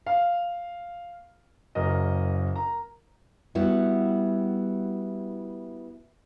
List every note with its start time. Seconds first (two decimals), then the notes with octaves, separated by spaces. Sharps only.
0.06 F5
1.75 F#1 F#2 A#4 D#5
2.56 A#4 A#5
3.55 G3 B3 E4 F#4